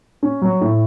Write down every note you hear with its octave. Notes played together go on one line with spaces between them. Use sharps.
C#4
F#3
A2